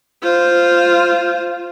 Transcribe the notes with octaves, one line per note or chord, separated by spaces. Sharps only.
F4 C5